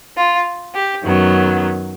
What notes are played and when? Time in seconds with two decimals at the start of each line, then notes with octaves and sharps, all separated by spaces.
0.16 F4
0.74 G4
1.03 F#2 D#3 F#3 B3